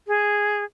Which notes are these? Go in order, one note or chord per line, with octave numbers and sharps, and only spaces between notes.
G#4